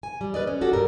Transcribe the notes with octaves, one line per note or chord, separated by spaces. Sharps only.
G#5
G3
B4 D5 D#5
C#4
F#4 G4 A4
G2 G3 A#4